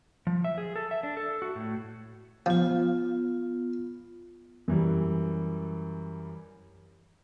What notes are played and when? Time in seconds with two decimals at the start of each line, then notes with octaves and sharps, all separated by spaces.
0.27 F3
0.44 E5
0.58 G#4
0.76 A4
0.91 E5
1.03 D4
1.17 A4
1.42 F#4
1.55 A2
2.46 F3 B3 F4
4.68 F#2 E3 G3